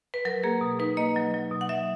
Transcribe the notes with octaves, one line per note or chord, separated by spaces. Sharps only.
B4
F#3 A#4
A#3 G#4
B2
D#4 B4
A#3 D#5
F#3
F#3
B2
F#5
F#3 E5